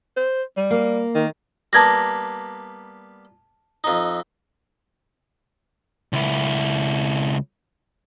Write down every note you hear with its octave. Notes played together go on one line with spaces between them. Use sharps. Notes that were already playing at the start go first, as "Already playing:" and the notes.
C5
G3
A#3
D#3
G3 A#3 B3 A5 G#6 A#6
F2 D#4
C#2 E4